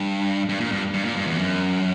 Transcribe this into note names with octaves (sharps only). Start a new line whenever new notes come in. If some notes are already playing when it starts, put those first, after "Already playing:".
Already playing: G2
G2
A#2
G2
G2
A#2
G2
E2
F#2